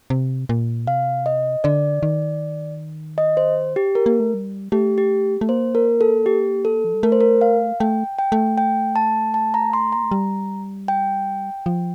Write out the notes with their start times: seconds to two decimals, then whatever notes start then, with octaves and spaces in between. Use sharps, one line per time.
0.10 C3
0.49 A#2
0.87 C3 F5
1.26 D#5
1.64 D3 D5
2.03 D#3
3.18 D#5
3.37 C5
3.76 G4
3.95 A#4
4.06 A#3
4.20 A3
4.34 G3
4.72 A3 G4
4.98 G4
5.41 A3
5.49 A#3 C5
5.75 A#4
6.01 A4
6.26 G4
6.65 A4
6.84 F3
6.94 G3
7.03 A3 A#4
7.12 C5
7.21 A#4
7.41 F5
7.80 A3 G5
8.19 G5
8.32 A3
8.58 G5
8.96 A5
9.34 A5
9.54 A#5
9.73 C6
9.92 A#3 A#5
10.03 A3
10.11 G3
10.88 G5
11.66 F3